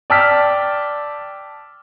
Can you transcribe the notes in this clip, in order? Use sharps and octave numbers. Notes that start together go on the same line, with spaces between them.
D5 G5 A5 E6 F6 B6